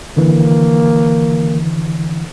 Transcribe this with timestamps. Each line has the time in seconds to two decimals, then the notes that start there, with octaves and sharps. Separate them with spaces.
0.17 D3 E3 A#3